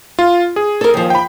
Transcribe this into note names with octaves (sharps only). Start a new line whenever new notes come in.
F4
G#4
A4 A#4
D#2 F3
G5 B5